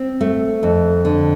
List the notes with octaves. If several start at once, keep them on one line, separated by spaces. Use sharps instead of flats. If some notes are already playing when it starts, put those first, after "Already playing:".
Already playing: C4
A3
F2
D3